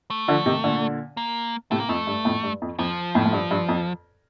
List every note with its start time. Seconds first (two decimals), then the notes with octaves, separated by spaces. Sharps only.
0.10 A3
0.28 D3 F3
0.46 C3 D#3
0.64 A#2 D3
1.17 A#3
1.71 A2 C3 A3
1.80 A#3
1.89 F2 A3
2.07 G2
2.25 F2 A2
2.43 G2
2.62 F2
2.79 F2 F3
3.15 F2 A2
3.26 A2
3.33 G2
3.51 G2
3.69 F2